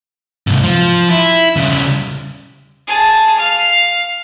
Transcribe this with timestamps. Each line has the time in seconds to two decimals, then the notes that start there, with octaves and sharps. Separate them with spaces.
0.47 G#2 C3
0.63 F3
1.10 E4
1.56 C#3 G3
2.87 G#4 A5
3.36 F5